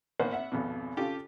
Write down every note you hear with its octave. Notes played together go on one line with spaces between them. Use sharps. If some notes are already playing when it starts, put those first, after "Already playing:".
G#1 A#3 B3 B4 C5 F#5
E5 F#5
G#1 F2 B2
C#3 F4 G4 A4